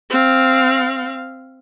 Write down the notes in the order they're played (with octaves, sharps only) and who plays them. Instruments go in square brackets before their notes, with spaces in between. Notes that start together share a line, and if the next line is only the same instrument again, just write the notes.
[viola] C4 F5